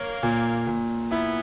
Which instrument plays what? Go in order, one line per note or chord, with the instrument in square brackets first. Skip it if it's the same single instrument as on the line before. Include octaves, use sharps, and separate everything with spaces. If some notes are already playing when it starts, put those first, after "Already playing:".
Already playing: [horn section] A#3 [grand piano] C#5
[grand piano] A#2
A#2
[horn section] B3 [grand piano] E4